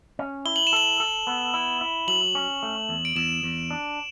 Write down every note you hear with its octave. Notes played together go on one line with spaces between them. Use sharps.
C#4
E4 G7
F#7
E7
A4 F#7
A4
B3
E4
E4
F#3 F#7
C#4
A3
E2
D7
E2 E7
E2
D4